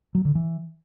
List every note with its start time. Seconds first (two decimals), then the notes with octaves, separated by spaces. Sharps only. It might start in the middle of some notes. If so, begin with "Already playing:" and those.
0.15 F#3
0.25 D3
0.35 E3